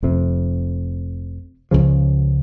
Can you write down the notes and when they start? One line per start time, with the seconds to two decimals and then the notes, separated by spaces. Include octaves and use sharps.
0.03 F1 F2 C3
1.71 C#2 C#3 F3